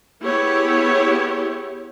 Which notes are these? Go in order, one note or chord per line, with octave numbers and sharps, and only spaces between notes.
B3 E4 G4 G#4 C#5